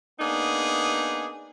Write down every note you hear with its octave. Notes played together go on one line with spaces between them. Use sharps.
A#3 B3 D4 D#4 G#4